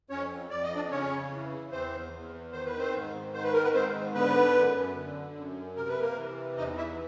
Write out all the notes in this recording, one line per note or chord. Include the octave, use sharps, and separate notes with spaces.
F2 C#4 C#5
F2 D5
D#5
D4 D5
C#3 C#4 C#5
E3
E2 C4 C5
E2
D#3 C5
B4
C4 C5
G#2
D#3 C5
B4
A#4
B3 B4
G#2 C4 C5
D3 B3 B4
F#2
D3
F#2
C3 A#4
B4
A#3 A#4
E3
E2 D#4 D#5
E4 E5